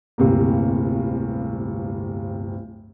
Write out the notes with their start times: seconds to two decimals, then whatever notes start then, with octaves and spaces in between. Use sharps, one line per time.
0.18 D1 G1 C3 A#3